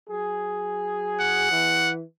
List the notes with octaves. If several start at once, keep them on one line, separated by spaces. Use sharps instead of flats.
F#3 G#4
F#5
E3